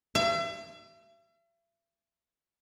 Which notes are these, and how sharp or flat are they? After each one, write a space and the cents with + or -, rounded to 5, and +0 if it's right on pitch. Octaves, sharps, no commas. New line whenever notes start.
E5 +40